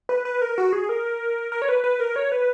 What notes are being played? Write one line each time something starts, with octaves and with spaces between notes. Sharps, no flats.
B4
B4
A#4
F#4
G#4
A#4
A#4
C#5
B4
B4
A#4
C#5
B4